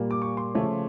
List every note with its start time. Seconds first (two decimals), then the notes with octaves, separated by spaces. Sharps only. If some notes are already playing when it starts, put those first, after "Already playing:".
Already playing: A#2 G3 A#3
0.11 D6
0.22 C#6
0.37 C6
0.55 C#3 F3 A3 C#4